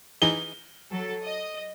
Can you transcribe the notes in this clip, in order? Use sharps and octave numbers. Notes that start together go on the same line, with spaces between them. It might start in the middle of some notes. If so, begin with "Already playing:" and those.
E3 D#4 G#4 G7
F#3 A4
D#5